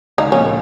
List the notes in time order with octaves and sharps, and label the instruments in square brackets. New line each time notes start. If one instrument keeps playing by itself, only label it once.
[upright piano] C#2 C#3 [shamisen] D#4
[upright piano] A#1 A#2 [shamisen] C#4
[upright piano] A#2